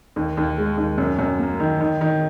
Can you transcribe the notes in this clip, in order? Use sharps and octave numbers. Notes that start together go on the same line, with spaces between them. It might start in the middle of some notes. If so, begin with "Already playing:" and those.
D#2
D#2
G#3
D#2
F#2
F#2
A#3
D#3
D#3
D#3